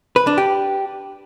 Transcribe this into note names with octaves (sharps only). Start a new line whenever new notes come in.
B4
D4
G4